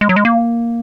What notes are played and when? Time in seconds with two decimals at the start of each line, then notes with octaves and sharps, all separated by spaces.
0.01 G#3
0.09 F#3
0.16 G#3
0.25 A#3